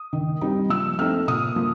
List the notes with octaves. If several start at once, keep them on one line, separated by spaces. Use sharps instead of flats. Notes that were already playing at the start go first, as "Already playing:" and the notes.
Already playing: D#6
D#3
G3 C4 D#4
F3 E6
A3 C4 D#4 F6
A#2 D#6
F3 A#3